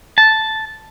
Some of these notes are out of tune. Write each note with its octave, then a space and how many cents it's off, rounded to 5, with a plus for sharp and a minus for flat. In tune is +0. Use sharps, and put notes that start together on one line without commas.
A5 -5